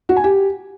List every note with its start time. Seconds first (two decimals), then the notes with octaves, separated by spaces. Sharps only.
0.09 F#4
0.16 G#5
0.24 G4